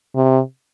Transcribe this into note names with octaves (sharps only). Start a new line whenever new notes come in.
C3